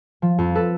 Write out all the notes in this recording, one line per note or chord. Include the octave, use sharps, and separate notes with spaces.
F3
F2
A4 B4